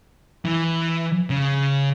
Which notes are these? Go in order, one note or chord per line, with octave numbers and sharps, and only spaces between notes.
E3
C#3